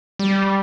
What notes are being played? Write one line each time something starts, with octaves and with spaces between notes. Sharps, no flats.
G3